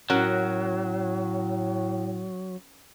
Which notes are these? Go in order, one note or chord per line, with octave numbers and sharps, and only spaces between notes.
A2 F#3 C#4 F#4 A#4